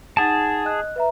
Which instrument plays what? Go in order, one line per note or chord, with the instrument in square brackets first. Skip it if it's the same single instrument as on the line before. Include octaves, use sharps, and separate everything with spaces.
[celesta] D#4 F#5 A6 [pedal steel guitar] G#4 A5
[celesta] D#5 F#6
B4 E5 A#5